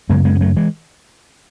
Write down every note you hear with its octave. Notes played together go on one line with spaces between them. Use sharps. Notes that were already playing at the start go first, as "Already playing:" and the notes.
F#2 C#3 G#3 B3
G#3 B3
B3
F#3 A3
E3 G#3